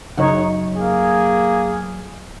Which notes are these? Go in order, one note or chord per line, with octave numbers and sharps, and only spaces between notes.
F#2 C#3 D#4 C#5 F#5
A#3 G#4